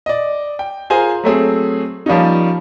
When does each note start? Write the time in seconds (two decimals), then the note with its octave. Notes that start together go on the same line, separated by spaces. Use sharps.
0.06 D5 D#5
0.59 G5
0.90 F4 G#4 A#4 C5 G#5 A#5
1.24 F#3 A3 C4 G#4
2.06 F3 G3 A#3 C#4 D#4